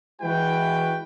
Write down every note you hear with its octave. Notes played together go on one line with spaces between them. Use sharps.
E3 G#3 E4 F#4 B4 G5